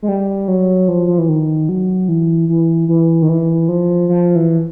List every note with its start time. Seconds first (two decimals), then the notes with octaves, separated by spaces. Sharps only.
0.03 G#3
0.08 G3
0.48 F#3
0.88 F3
1.07 F3
1.18 E3
1.29 D#3
1.69 F#3
2.08 E3
2.49 E3
2.88 E3
3.22 D#3
3.29 E3
3.69 F3
4.09 F3
4.36 E3